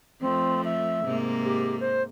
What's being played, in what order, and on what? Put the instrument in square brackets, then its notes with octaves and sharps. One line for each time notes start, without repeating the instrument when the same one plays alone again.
[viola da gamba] F2 F3 A3 [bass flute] C4
[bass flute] E5
[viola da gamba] G#2 C3 A#3
[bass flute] G4
C5